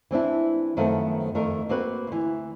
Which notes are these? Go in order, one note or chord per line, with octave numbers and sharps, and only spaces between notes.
E3 C4 D4 E4
F#2 D#3 F3 A3 B3 C4
F2 D#3 A3 A#4
A#3 C4 F#4 B4
D2 E3